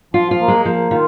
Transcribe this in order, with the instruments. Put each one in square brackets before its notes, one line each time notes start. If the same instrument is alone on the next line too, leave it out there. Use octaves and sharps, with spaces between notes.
[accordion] F3 [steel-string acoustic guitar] F4
[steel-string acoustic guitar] F4
[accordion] A#3
[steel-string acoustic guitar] G#3
[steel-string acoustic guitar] F3 [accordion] A#3
[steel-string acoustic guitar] D#3 [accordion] F4